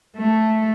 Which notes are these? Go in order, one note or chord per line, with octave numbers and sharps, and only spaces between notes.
A3